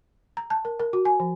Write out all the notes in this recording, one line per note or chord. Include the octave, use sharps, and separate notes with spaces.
A#5
A5
A#4
A#4
F#4
G#5
F3